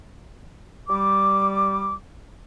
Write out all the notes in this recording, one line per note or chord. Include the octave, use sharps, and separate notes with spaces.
G3 D6